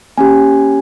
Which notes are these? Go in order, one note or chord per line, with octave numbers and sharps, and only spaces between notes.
A#3 C#4 G4 G#5